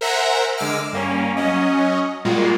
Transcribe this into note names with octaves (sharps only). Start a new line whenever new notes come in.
A#4 C5 E5 F#5 G#5 A#5
D3 G#3 D6 E6 F6 D7
G2 A#3 C#4
F#3 C#4 D#5
A#2 G3 G#3 A#3 F4 F#4